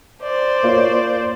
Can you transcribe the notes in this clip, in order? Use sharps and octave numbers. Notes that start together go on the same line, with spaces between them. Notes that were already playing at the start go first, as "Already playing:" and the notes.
C5 D5
A#3 F4 C#5